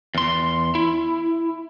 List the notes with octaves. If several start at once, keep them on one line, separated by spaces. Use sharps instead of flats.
E2 C6
E4